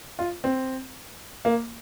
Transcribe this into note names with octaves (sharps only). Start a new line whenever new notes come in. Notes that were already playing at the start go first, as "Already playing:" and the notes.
F4
C4
A#3